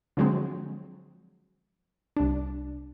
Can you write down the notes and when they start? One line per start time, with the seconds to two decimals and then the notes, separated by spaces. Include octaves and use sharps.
0.17 D3 F3 F#3 G#3 C4
2.17 C2 D4